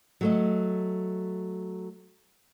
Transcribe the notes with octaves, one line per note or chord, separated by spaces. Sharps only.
F#3 A3 D#5